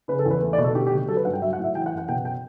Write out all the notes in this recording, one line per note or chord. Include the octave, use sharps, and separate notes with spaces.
C#3 B4
A4
E2
B4
A3
D5
B2
A4
D3 G4
G4
D2
G4
F#3 A4
B4
G2 F#5
G5
F#3 E5
F#5
A2
E5
E3 G5
F#5
F#2
F#5
B2 G5
G5